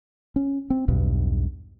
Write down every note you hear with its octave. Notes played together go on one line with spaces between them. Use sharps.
C#4
C4
B1 E2 G2 B2